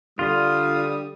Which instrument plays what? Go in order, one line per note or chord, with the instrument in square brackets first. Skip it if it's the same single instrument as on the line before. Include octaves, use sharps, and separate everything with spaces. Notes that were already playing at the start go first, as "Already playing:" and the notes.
[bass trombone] D3 [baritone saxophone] G3 [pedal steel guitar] F4 [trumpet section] D#6